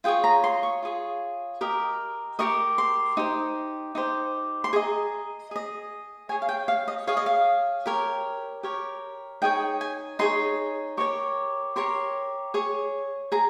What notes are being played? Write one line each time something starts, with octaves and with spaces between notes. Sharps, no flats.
F4 G#4 C#5 G5
A#5
C6
C#6
F4 G#4 C#5
G4 A#4 D#5
G4 A#4 D#5 C#6
C6
D#4 G4 C5
D#4 G4 C5
C6
G#4 D#5 A#5
G#4 D#5
G#4 C#5 G#5
F5
G5
F5
D#5
G#4 C#5 F5
D#5
F5
G4 A#4 C#5
G4 A#4 C#5
D#4 G#4 C#5 G5
G#5
D#4 G#4 C#5 C6
G4 A#4 C#5 C#6
G4 A#4 C#5 C6
G#4 C#5
G#4 A#5